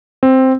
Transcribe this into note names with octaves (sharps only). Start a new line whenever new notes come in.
C4